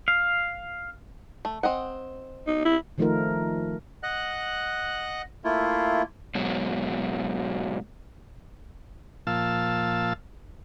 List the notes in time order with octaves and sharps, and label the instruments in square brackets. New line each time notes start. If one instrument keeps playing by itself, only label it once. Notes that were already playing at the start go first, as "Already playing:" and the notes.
[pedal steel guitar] F5
[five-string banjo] A3
C4 D#5 F#5
[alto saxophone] D#4
E4
[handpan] D#3 F3 A3 D#4 F4 A#4
[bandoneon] D#5 F#5 F#6
A3 A#3 E4 F4
[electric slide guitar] G#2 B2 F#3
[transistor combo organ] A#2 F3 F5 A5 E6